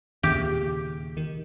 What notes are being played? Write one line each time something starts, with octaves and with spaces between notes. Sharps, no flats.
D#2 A#2 C#3 G4
D#3